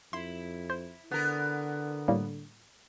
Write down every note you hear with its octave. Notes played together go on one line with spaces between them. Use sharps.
F2 E4 C6
C5
D3 B3 A#4
A2 G3 A#3